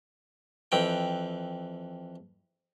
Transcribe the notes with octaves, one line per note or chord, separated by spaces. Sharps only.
F2 E3 G5